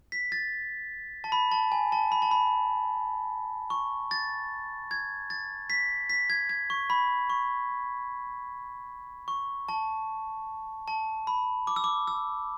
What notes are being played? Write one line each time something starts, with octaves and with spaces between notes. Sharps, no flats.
B6
A6
A5
B5
A5
G#5
A5
B5
A5
B5
C#6
A6
G#6
A6
B6
B6
G#6
G#6
C#6
B5
C#6
C#6
A5
A5
B5
D6
E6
D6
E6